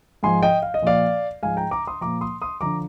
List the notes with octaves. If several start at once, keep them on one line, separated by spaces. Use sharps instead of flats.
G#2 F3 G#5 C6
D#5 G5
F5
D#5
A#2 F3 D5 F5
G#2 F3 F5 G#5
G5 A#5
A#5 D6
C6 D#6
A#2 F3 A#5 D6
C6 D#6
C6 D#6
D3 F3 A#5 D6